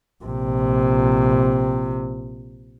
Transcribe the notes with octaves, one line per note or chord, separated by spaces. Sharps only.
A#1 C3